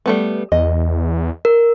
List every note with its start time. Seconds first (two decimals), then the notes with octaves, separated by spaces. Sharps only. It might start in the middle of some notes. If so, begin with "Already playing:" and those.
0.06 G3 A3 B3
0.52 E2 D#5
1.45 A#4